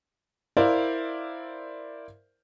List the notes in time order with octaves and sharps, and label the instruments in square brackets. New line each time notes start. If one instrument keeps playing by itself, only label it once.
[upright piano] E4 A#4 C5 D5 F5